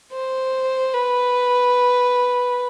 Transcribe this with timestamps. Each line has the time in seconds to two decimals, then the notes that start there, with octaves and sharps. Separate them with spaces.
0.13 C5
0.94 B4